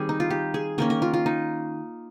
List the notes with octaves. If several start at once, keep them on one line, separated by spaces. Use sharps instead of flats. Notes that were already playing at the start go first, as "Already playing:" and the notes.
Already playing: D#3 G3 C4 G#4
D#4
F4
G4
G#4
D#3 A#3 C#4 A#4
A#4
F4
F4
D#4